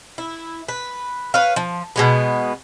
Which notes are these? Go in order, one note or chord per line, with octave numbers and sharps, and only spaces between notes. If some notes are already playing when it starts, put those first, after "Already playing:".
E4
B4
B4 C#5 F5
F3
B2 G#3 B3